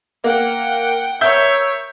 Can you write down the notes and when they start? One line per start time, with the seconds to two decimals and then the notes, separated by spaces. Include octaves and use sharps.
0.24 A#3 F#5 G5
1.21 A#4 C#5 E5 E6 G6